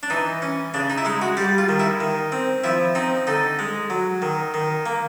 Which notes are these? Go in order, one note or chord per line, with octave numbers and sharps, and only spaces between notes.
D4
E3 D#4
C#4
C#3 D4
D#4
E4
G#3 D#4
F#4
G3 G4
F4
D#3
E4
D#3
C4
F3 E4
C4 D#4
D3 D#4
G#3
F#3
D#3
D#3
A#3